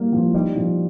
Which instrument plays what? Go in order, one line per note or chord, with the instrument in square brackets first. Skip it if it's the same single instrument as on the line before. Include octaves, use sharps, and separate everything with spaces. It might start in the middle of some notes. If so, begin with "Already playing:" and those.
Already playing: [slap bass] G3 [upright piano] A#3 A#4
[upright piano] F3
[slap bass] G3 [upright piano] D#4
[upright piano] F3